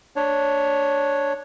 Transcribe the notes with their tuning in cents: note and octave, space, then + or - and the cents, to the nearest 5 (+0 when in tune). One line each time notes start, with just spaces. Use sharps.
D4 +0 C#5 +0